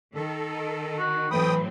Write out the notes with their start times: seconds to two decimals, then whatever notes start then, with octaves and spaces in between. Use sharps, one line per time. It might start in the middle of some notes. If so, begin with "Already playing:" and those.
0.15 D#3 A4
0.98 F#4
1.31 A2 E3 F#3 A3 C4 G5 B5 D#6